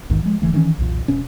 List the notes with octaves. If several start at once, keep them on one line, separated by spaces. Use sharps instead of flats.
A#1 E2 G#2 D#3
F3 G#3
F1 D3 E3 A3
D#3 E3 A3 C#4
B1 E2 A#2
E1 B2 C#4